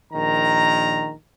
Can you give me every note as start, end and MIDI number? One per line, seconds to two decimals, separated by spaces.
0.12 1.13 34
0.12 1.13 51
0.12 1.13 82